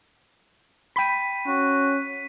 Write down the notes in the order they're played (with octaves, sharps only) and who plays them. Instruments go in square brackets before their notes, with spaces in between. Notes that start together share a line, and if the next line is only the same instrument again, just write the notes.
[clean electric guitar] G5 B5 [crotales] B6 D#7
[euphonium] C#4 [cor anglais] F#4